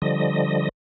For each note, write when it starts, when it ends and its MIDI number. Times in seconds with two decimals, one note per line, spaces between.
0.02 0.69 50
0.02 0.69 53
0.02 0.69 55
0.02 0.69 75